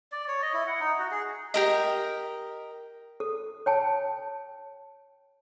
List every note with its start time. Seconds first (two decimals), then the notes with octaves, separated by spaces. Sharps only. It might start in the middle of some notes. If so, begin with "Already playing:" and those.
0.12 D5
0.28 C#5
0.42 D#5
0.54 E4
0.67 F#5
0.80 D#4
0.99 F#4
1.11 G#4
1.54 G4 A#4 D#5
3.20 A4
3.66 C#5 G5 A5